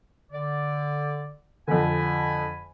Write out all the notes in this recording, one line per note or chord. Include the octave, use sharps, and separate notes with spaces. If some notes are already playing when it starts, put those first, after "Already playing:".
D3 D5
F2 D3 G#5 B5